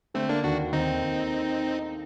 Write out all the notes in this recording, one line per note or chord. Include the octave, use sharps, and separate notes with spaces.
D3 A3 C4
A#3 D4
D#2 D4 F#4
D#2 C4 D#4
D#2